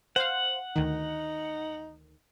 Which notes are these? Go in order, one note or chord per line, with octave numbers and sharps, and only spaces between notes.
C5 F5 F#5
D2 D#3 D#4